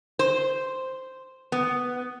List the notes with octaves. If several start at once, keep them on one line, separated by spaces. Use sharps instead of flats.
C5
B3